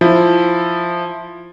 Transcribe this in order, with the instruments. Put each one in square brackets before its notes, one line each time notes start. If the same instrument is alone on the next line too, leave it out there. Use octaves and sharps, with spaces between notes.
[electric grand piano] F3 E4